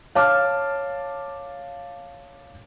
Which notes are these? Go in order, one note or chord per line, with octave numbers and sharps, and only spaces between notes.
C#5 F5 A5 D6 F6